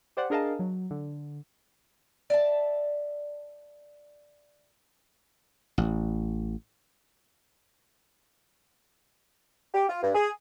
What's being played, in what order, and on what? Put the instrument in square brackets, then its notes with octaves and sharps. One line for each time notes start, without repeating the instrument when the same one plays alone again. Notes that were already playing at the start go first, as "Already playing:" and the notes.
[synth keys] G4 C5 D5 F#5
D4 G#4 A#4 D#5 F5 A5
F#3
D3
[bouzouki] D5 E5 A5
[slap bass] A1
[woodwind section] G4
F4
G2
G#4